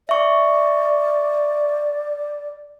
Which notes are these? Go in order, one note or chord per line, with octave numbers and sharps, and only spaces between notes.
D5 E5 C#6